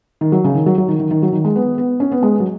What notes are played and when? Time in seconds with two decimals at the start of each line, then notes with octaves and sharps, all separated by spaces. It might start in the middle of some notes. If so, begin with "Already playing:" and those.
0.21 D#3
0.32 F#3
0.44 C#3
0.55 D#3
0.66 F#3
0.78 F#3
0.88 D#3
1.00 D#3
1.11 D#3
1.23 F#3
1.33 D#3
1.44 G#3
1.56 B3
1.78 B3
2.00 C#4
2.12 B3
2.23 G#3
2.40 F#3